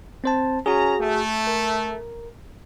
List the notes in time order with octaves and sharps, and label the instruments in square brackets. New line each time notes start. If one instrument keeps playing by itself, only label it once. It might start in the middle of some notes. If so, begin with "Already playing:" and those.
[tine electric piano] C4 C5 A5
[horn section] C#4 A#5 [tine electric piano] F#4 G#4
[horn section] A3
[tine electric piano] A#4